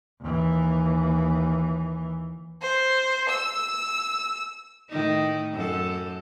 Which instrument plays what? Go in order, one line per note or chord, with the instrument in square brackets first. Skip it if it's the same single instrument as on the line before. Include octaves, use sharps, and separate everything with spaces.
[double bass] D#2 E3
[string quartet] C5
E6
[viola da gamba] A2 D#3 D#4
F#2 A4